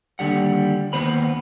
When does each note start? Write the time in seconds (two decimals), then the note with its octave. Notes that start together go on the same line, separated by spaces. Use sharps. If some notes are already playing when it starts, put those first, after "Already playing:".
0.19 D#2 D3 G3 F#5
0.93 D#2 B3 C5 B5